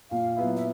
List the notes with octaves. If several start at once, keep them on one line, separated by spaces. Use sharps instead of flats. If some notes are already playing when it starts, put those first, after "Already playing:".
A#2 F5
F#3 B3 E4
E5